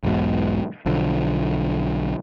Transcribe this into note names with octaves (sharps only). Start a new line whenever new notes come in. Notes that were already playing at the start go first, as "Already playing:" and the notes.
B1 E2 G#2 B2
B1 D3 F3